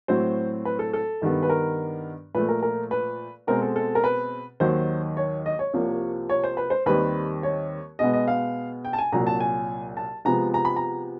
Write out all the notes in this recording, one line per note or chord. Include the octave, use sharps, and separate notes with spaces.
A2 F#3 A3 C4 C5
B4
A4
A4
G2 D#3 G3 B3
B4
A#4
A#2 F3 A3 B4
A#4
A#4
B4
B2 G#3 C4 A#4
A4
A4
A#4
B4
D#2 D#3 F#3 C5
C#5
D#5
C#5
C2 C3 F3 A#3
C#5
C5
B4
C5
D#2 D#3 G3 C4 B4
C#5
B2 G#3 B3 D#5
D#5
F5
G5
A5
G#5
C2 A#2 F#3 A#5
A5
G#5
A5
C3 F3 G#3 B3 A#5
A#5
B5
A#5